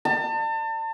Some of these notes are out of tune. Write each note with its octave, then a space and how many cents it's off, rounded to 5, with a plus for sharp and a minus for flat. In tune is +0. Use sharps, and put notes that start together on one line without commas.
A5 +35